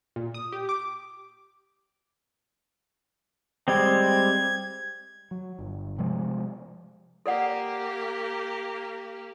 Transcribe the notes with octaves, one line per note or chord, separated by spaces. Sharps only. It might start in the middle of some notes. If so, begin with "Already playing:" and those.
A#2
D#6
G4
D6
G3 G#3 C4 G#6
F#3
G1
C3 F3 G#3
A#3 G4 A4 D5 F#5